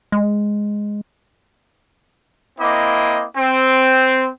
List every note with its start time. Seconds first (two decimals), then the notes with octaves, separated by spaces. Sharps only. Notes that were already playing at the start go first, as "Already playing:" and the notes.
0.12 G#3
2.59 A#3 C4 E4 D#5 D6
3.37 C4